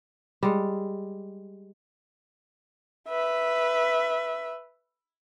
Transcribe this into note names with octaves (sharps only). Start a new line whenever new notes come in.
G3 G#3
B4 E5